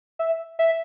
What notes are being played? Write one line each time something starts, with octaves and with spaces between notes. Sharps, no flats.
E5
E5